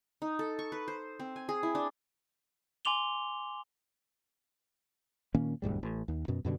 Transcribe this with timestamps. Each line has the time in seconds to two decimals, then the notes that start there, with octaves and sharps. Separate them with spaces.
0.22 D#4
0.39 A4
0.59 C#6
0.72 B4
0.88 C5
1.20 C4
1.36 G#5
1.49 G#4
1.63 E4
1.75 D4
2.85 G#5 C6 D6 F7 G7
5.34 A#2 D#3 A#3 C#4
5.62 E1 D2 G#2 G3
5.83 A1
6.08 D#2
6.28 F#2 B2
6.45 F#2 B2 D3 G3